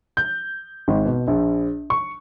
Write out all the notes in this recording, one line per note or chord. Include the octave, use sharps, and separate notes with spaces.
G6
G#1
B2
A#1
C#6